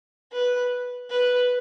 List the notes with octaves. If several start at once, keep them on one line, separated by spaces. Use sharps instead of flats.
B4
B4